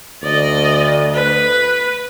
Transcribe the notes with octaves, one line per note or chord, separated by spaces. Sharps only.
D2 D5 D#5
B4